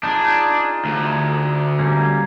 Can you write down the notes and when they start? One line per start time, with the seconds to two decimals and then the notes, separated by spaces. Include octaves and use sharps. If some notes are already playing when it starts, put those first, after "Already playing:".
0.04 D4 D#4 F4 G#4
0.85 D2
1.79 G3 A#3 C#4